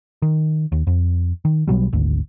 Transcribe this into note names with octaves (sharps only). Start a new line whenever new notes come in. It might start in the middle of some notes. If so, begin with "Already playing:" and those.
D#3
D#2
F2
D#3
B1 B2 F#3 G3
G#1 D2